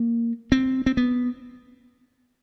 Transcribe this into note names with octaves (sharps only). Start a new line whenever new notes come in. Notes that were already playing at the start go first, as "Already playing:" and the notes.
Already playing: A#3
C4
C4
B3